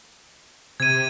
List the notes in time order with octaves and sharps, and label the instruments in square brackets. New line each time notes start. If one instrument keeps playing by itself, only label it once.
[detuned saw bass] C3 [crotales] G#6 D#7